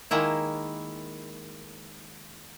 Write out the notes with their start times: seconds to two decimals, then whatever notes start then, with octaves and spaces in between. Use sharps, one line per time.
0.11 D#3 G#3 A#3 E4